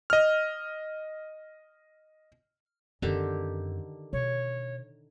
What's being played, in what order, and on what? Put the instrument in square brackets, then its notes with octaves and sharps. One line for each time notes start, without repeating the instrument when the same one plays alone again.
[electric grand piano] D#5 F6
[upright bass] F#2 C4 [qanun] D3 D#3 G4
[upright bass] B2 [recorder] C#5